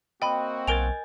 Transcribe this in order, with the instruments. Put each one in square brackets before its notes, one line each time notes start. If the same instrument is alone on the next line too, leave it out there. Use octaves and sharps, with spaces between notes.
[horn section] A#3 C4 F#4 [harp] D#5 [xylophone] G5 B5
[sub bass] B1 [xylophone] A#4 D7 F7 [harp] G#5 G6 A6